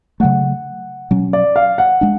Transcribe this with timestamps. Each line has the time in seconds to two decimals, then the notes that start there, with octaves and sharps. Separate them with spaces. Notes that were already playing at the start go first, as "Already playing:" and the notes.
0.20 C#3 F#3 A3 F#5
1.11 B2 F#3 C#4
1.33 D5
1.56 F5
1.78 F#5
2.01 G#3 D4